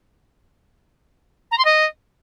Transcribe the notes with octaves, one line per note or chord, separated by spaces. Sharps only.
A#5
C6
D#5